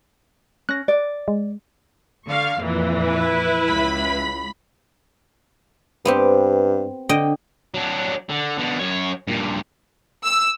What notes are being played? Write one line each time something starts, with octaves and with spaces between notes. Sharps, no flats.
C#4 F#6 A#6
D5
G#3
D3 F5 C#6
F2 A#2 E3
E4 B4
C#2 B5
G2 B3 C4 G4
D3 D#5 G5
F#3 D4
D3
B2 D3
F#2 C#5
G2 A#2
E6